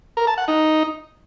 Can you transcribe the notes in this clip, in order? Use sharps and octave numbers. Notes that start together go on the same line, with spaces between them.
A#4
A5
F#5
D#4